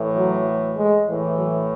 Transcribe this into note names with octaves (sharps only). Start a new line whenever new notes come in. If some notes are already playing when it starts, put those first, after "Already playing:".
Already playing: A2 E3
F#3
G#3
A2 E3
F#3